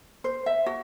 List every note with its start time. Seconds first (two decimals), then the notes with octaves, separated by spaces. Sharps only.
0.24 C5
0.46 E5
0.66 F#4